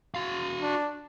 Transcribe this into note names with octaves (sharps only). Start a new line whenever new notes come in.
F#4 F5
D4